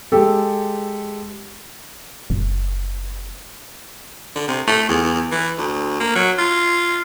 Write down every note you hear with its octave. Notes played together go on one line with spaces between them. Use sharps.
G#3 G4 A4
F#1
D3
C3
A3
E2
E3
D2
A#3
F#3
F4